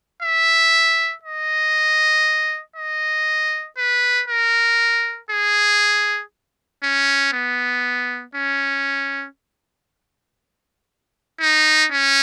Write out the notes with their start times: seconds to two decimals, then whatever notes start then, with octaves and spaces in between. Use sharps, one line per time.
0.22 E5
1.23 D#5
2.76 D#5
3.78 B4
4.29 A#4
5.31 G#4
6.83 C#4
7.33 B3
8.35 C#4
11.41 D#4
11.91 C#4